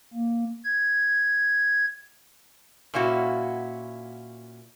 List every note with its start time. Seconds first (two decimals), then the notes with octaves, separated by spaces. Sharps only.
0.13 A#3
0.64 G#6
2.94 A#2 A#3 C#4 E4 F#4